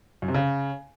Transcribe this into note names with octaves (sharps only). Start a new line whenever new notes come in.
F#2
C3
C#3